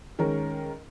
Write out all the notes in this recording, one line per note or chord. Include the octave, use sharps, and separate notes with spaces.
D#3 G#3 C#4 A#4